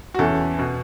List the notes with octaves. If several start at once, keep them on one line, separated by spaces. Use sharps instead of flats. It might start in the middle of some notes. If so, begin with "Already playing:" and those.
F#4
E2 E3 C#4 A4
B2 B3